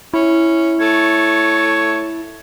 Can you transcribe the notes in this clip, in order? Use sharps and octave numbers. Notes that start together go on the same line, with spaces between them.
C#4 E4
A3 C#5